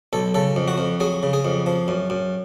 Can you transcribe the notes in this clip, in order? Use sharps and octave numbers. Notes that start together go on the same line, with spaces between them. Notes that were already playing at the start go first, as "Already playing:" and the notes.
B1 A4
C#3 A4
F2
F#4
F2
F#3 G#4
C#3
G#4
F2
F3
F#2
F#2